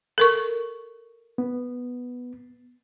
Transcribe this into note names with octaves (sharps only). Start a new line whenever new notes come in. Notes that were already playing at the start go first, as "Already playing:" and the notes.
A4 A#4 C#6
B3